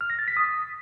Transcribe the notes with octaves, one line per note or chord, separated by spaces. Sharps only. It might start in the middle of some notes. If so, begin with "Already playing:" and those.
F6
A#6
A6
B6
D#6